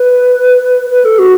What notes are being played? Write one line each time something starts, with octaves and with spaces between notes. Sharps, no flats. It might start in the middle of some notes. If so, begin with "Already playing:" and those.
Already playing: B4
B4
A4
F#4